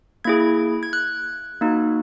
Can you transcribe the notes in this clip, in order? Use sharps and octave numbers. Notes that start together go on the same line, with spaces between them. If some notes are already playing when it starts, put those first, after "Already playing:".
A#3 E4 G#4 G#6
G#6
F#6
A#3 D#4 F#4